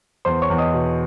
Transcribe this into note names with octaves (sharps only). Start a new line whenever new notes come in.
E2 C5 C6
C#5 C#6
E2
D#5 D#6
B2